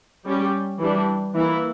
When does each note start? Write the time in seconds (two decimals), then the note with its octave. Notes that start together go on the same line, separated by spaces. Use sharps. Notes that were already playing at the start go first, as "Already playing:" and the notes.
0.26 G3 C#4 G4
0.79 E3 G3 D4
1.34 E3 A#3 E4